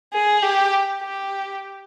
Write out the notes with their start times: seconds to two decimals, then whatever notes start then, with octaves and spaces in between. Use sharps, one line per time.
0.14 G#4
0.43 G4
1.01 G4